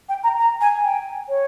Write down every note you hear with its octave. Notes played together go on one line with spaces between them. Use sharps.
G5
A#5
A#5
G#5
G5
C#5